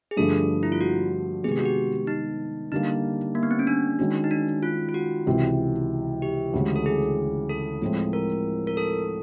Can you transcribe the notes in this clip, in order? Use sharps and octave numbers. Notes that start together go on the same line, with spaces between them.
G#4
G2 D3 F3 A3 A4
E4
F4
F#4
C3 D#3 G#3 B3 G#4
G4
F#4
G4
D#4
D3 G3 A#3 D#4
A#3
B3
C4
C#4
D4
D#3 G#3 C#4 F#4
D#4
D4
F4
F4
F#4
C#2 C3 E3
G4
D2 C#3 E3 G#3
A4
G#4
A4
A2 F3 G#3 C4 E4
A#4
A#4
A4